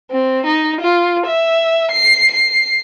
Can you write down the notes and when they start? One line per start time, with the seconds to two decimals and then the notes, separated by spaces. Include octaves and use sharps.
0.11 C4
0.46 D#4
0.81 F4
1.26 E5
1.91 C7
2.31 C7